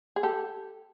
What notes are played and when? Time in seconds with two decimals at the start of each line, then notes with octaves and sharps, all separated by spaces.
0.16 G#4
0.23 G4 A4